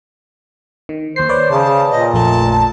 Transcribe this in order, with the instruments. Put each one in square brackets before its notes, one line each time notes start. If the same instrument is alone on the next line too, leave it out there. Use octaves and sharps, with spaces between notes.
[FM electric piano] D#3
[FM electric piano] D#2 C7 [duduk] C5
[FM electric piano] B4 C#5 D5
[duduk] C#3 [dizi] A5
[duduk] A#2 [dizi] D#5
[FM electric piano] A#1 F2 A3 [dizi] A5